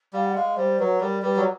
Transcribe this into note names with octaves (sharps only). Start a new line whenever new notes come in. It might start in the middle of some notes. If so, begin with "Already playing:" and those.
G3 F5
F#5
G#3 F5
G3 C5
F#3 B4
G3 A#4
G3 B4
F#3